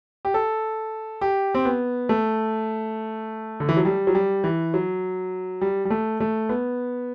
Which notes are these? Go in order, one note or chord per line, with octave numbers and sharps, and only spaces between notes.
G4
A4
G4
C4
B3
A3
D3
E3
F#3
G3
F#3
G3
E3
F#3
G3
G3
A3
A3
B3